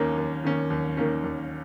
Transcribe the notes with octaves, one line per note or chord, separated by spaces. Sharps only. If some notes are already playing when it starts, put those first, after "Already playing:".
Already playing: D#2 D#3 A#3 C#4
D#2
D#3 A#3 C#4
D#2
D#3 A#3 C#4
D#2